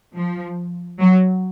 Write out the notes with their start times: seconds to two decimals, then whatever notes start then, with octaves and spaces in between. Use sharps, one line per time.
0.16 F3
1.00 F#3